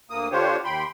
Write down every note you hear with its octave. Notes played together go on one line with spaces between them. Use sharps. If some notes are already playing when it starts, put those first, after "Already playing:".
D2 A#3 D#6
D3 D4 F4 G4 C5 C#5
D#2 G5 B5 C6